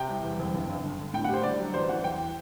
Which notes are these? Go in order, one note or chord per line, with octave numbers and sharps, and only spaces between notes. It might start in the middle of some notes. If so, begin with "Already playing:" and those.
Already playing: C3 G5
C2
E2
F#1
G1
G1
D3
D3
A2 G5
F#5
G3 C5
D3 D5
F#3
A1 C5
E3 F#5
E2 G5